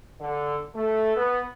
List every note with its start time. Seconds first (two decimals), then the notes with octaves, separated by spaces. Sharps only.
0.20 D3
0.75 A3
1.16 B3